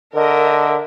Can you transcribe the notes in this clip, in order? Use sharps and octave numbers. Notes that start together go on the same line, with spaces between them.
D3 A#4 D#5 E5